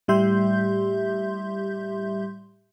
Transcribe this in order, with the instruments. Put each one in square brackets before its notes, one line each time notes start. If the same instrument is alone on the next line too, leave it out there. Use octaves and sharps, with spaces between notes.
[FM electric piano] A2 G3 G4 E5 C6 G6